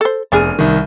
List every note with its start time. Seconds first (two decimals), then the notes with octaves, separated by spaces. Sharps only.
0.01 A4 C5
0.32 F1 B3 D4 G#4 F6 D#7
0.59 C2 D#3